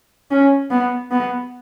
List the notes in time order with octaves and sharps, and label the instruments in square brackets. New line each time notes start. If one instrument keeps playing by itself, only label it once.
[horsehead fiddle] C#4
B3
B3